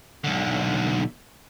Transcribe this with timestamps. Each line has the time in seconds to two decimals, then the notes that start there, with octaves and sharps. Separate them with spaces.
0.24 B1 D3